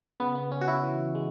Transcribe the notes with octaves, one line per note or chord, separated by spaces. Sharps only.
C#3 B3
B3
B3 C#4
F#4
E4
E3
G#3